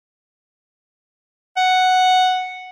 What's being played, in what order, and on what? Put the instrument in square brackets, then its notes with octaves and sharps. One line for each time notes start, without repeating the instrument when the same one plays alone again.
[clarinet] F#5